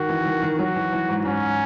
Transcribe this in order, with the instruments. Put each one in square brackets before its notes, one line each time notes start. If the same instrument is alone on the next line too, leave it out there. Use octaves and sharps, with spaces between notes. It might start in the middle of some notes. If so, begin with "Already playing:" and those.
Already playing: [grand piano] D#3 [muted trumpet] F#4
[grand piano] E3
D#3
D#3
[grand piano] F#3 [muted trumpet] F#4
[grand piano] E3
E3
G#2
[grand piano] G#2 [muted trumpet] C#4